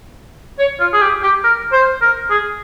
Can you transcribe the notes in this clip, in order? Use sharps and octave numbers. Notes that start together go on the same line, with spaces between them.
C#5
F4
G#4
G4
G4
A#4
C5
A#4
G#4